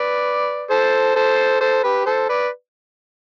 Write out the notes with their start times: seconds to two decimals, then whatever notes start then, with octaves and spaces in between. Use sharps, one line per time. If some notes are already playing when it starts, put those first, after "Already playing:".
Already playing: B4 D5
0.70 A4 C5
1.16 A4 C5
1.60 A4 C5
1.83 G4 B4
2.06 A4 C5
2.29 B4 D5